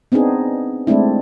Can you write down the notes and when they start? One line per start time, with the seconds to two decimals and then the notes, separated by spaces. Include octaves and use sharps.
0.12 B3 C4 D4 D#4 G#4
0.87 G#3 A3 C4 D4 E4